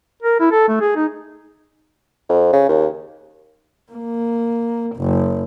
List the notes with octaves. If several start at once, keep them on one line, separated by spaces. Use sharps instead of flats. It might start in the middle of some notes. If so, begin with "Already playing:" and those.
A#4
E4
A4
A3
G#4
D#4
F2
C#3
D#2
A#3
F#1